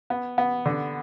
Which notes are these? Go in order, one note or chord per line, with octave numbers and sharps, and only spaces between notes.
B3
B3
D3